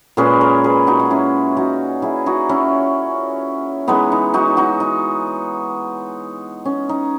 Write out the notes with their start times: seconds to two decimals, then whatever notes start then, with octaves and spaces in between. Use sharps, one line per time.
0.17 A#2 G#3 C#4 G#4 B4
0.41 A#4 C#5
0.64 G#4 B4
0.87 D#4 F#4
0.99 D#4
1.10 C#4 E4
1.57 D#4 F#4
2.02 E4 G#4
2.26 D#4 F#4
2.49 C#4 E4
3.88 E3 G#3 B3 D#4
4.12 D#4
4.34 D#4 F#4
4.57 D#4 F#4
4.80 D#4
6.65 C#4
6.89 D#4